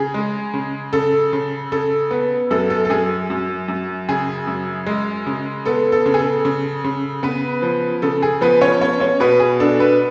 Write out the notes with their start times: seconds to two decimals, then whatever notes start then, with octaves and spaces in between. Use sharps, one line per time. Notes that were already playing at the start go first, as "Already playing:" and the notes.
Already playing: C#3 G#4
0.14 G#3
0.54 C#3
0.93 C#3 A4
1.33 C#3
1.72 C#3 A4
2.11 B3
2.51 F#2 A4
2.70 A4
2.85 A4
2.90 F#2 G#4
3.30 F#2
3.68 F#2
4.09 C#3 G#4
4.47 F#2
4.86 G#3
5.27 C#3
5.65 B3 A4
5.92 A4
6.06 C#3
6.14 G#4
6.19 A4
6.45 C#3
6.84 C#3
7.23 C#3 B3 B4
7.62 F3
8.02 C#3 A4
8.22 G#4
8.41 F3 B3 B4
8.61 C#4 C#5
8.81 B3 C#4 C#5
9.00 C#4 C#5
9.20 B2 B3 B4
9.40 G#4
9.60 D4 A4
9.79 B3 B4